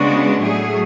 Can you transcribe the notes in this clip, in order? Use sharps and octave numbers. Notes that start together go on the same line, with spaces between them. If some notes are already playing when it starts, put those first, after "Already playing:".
Already playing: C#3 G#3 B3 D4 F#4
A2 F#3 A3 G#4